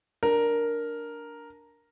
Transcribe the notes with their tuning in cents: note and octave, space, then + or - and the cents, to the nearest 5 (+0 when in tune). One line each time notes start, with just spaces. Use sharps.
D4 +0 A#4 +0